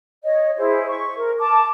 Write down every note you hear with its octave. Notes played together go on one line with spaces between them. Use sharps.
C#5 D#5
E4 G#4 C5
C#6
A#4
A5 D6